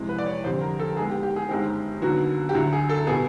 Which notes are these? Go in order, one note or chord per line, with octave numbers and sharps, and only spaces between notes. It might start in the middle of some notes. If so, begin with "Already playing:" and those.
Already playing: F2 C3 E3 G#3
B4
D5
C#5
F1 F2 D3 G3 C4 C5
A#4
A4
D#2 D#3 G#3 B3 G#4
G4
G4
G#4
G1 F#2 D#3 G#3 C4 G4
D#2 D3 F#3 B3 F#4
G4
D2 D3 F#3 F#4
G#4
A4
B2 G3 B3 G#4